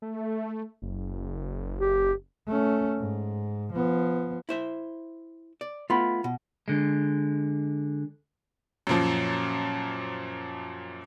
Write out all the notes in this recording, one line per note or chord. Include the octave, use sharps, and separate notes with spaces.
A3
F#1
G4
A3 C#4
G#2
F3 B3
E4 C5 E5
D5
A3 B3 F4 B5
B2
D3 G#3
F#2 A#2 F3